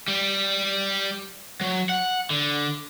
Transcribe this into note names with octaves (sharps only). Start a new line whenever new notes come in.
G3
F#3
F#5
D3